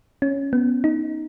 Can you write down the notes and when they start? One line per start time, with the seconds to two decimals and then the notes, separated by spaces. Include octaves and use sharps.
0.22 C#4
0.53 B3
0.84 D#4